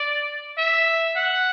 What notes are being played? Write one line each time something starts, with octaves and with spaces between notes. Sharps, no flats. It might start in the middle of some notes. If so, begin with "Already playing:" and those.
Already playing: D5
E5
F#5